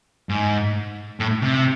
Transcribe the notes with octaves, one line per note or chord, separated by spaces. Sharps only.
G#2
A2
C3